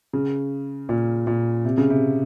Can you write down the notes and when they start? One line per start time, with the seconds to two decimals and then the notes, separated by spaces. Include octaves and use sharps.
0.13 C#3
0.89 A#2
1.27 A#2
1.65 C3
1.78 C#3
1.90 C3